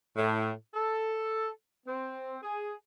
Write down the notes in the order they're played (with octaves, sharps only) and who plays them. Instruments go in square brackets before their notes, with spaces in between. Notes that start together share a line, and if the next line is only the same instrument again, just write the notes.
[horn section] A2
A4
C4
G#4